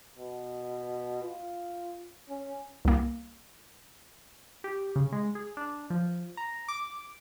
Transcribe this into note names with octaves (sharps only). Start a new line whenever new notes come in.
B2
F4
C#4
C2 A#3
G4
C#3
G#3
G#4
D4
F3
A#5
D6